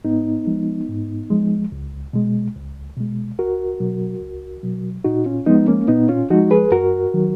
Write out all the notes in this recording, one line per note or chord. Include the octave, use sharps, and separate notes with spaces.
G#2 B3 D#4
F3 G#3
G#2
F3 G#3
C#2
B2 G#3
C#2
B2 G#3
C#2 F#4 A#4
B2 F#3
C#2
B2 F#3
A#2 D#4 F#4
C#4 F4
F3 G#3 B3 D#4
A#3 C#4
A#2 B3 D#4
C#4 F4
F3 G#3 D#4 F#4
G#4 B4
F#2 F#4 A#4
D#3 F#3